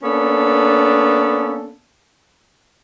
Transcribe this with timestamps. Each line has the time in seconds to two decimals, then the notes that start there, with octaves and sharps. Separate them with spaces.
0.03 A#3 B3 C#4 D4 A4